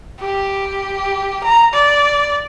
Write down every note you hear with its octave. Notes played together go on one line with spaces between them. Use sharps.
G4
A#5
D5